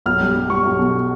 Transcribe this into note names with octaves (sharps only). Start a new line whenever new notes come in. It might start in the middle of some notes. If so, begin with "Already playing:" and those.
B1 F6
G3
G3
G3 C#6
B1
B2